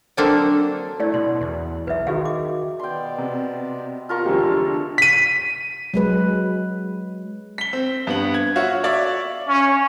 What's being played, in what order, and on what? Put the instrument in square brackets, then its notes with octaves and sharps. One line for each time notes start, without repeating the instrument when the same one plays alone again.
[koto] D3 F#3 A#3 C4 D4 A4
[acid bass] A3 [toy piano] E4 D5
[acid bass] B2 [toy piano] C6
[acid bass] E2
[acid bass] B1 [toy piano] B4 E5
[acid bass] D#3 [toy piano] F#4 G#4 F5
[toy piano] D6
[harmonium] B2 B3 D5 [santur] G5 C6
[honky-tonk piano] C3
[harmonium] E2 C3 A5 [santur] F4 A#4 C#6
[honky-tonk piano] D3 F3 G#3 [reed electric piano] G4
[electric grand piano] B6 D#7
[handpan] F#3 G#3 B4
[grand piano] B6 G7
C4
G2 B3 F#7
G#6
F4 F#4 C#5 E5 F5
C#5 D5 E5 F5 D6
[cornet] C#4